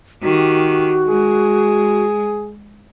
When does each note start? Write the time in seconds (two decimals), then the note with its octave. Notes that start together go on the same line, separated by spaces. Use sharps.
0.23 D#3 F#4 G4
1.07 G#3 G#4